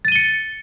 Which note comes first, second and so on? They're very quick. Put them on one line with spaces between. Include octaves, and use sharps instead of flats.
A6 D#7 G7 C#7